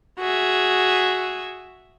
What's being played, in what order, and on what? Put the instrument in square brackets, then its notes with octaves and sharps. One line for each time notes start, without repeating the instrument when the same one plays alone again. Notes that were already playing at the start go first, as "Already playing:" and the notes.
[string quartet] F#4 G#4 E5